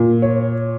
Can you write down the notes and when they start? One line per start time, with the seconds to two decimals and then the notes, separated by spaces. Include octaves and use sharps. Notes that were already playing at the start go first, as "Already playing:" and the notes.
Already playing: A#2
0.22 C#5